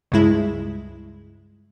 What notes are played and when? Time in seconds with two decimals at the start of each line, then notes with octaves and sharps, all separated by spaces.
0.12 C#2 G2 G#3 E4